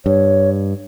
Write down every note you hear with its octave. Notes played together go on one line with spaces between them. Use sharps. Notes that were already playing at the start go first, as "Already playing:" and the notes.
G2 C#5